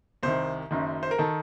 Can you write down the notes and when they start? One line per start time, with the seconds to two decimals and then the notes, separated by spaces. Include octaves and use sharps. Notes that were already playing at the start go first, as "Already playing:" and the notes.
0.23 C2 C3 D#3 C5
0.71 F#1 F#2 D#3
1.03 C5
1.11 A#4
1.18 D#3 A4